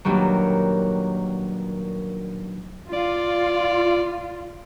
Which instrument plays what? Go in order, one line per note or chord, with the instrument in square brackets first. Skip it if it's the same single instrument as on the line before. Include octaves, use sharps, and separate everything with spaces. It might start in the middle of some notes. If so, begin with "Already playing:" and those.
[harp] G2 A#2 D#3 F#3
[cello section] F4 [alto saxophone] D5